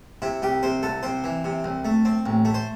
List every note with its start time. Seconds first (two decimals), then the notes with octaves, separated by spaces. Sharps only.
0.22 C3 E4
0.42 C2 G4
0.63 C3 C5
0.83 C2 A4
1.03 C3 C5
1.24 E3
1.44 C3
1.64 C2
1.85 A3
2.05 C4
2.26 A1
2.45 A3
2.54 C5